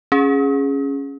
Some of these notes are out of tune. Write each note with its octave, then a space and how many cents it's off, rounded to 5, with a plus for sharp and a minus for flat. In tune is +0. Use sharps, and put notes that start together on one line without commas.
C#4 +0 G#4 +0